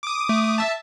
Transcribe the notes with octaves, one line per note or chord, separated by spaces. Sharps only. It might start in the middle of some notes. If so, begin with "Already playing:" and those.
D6 D#6
A3
E5 A5